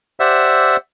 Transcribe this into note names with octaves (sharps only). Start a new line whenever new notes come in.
G4 C5 D5 E5 F#5 E6